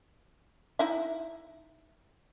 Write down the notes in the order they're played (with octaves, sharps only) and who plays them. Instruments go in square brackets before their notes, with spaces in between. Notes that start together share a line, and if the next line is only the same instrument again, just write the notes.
[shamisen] D#4 E4 E5